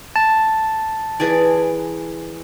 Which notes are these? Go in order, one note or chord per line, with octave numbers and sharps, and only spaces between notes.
A5
E3 G#4 D5